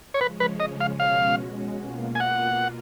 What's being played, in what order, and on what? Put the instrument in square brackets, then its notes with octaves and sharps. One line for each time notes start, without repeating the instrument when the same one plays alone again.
[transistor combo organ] C#5
[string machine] C#3 F3 G#3 C#4 [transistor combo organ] B4
[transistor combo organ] B4
D#5
F5
[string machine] B2 G#3 C#4 F#4 [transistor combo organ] F5
[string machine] B2 A#3 F4
[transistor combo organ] G#5
F#5